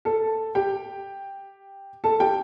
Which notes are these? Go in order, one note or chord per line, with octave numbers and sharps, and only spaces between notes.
A4 A5
G4 G5
A4 A5
G4 G5